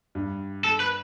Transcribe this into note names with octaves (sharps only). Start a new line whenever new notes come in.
G2
A4
B4